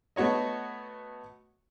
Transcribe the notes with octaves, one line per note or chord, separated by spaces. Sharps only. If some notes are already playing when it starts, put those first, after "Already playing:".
A3 B3 F#4 C#5 D#5